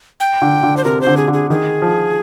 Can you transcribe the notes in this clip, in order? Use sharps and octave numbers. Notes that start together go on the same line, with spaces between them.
G5
D3
D3
C5
C3 A#4
C5
D3
G#4
D3
G#4
D#3 G#4
F3